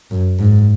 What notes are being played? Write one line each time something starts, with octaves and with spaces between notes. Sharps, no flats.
F#2
G#2